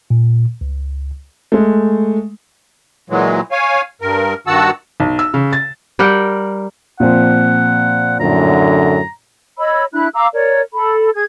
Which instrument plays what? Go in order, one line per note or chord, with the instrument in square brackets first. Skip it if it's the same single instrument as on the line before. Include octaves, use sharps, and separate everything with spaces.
[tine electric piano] A#2
C#2
[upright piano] G#3 A3
[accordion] A#2 E3 F#3 G#3
C#5 F5 G#5
G2 A#4
G2 D#3 F#4 F#5 A5 E6
[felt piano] B1
E6
C#3
A6
[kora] G3 A#4 F#5 G5
[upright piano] A#2 F3 C4 [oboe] F#5
[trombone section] F#2 A2 D3 [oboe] A#5
[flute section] C#5 D#5 B5 E6
D4 E4 B5 F#6
F5 A#5 D6 E6
A#4 C#5 D5
A4 B5
G#4 G#6